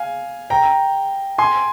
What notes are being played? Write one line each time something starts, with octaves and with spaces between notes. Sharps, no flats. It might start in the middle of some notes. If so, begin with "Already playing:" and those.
Already playing: F5 G#5
G5 A#5
G#5 C6